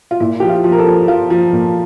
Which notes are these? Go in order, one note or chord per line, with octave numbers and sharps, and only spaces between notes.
F4
A#2 E4
F3 G4
F4
F3
A#4
A4
F3
F3 F4
F3
A#2